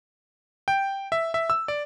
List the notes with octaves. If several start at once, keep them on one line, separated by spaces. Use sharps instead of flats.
G5
E5
E5
E6
D5